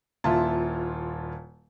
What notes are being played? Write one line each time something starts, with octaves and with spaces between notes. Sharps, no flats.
D#1 A#2 E4 F4 A5